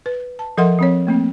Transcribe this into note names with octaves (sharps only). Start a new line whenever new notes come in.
B4
A5
F3 A4 A#4 E5 F#5 C6
F3 C4 C#5
A3 A#3 C4